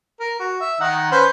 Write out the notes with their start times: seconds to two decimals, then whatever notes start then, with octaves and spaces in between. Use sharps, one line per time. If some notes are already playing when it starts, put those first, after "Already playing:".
0.20 A#4
0.39 F#4
0.60 E5
0.80 D#3 D#4 F#5
1.11 C#4 B4 C5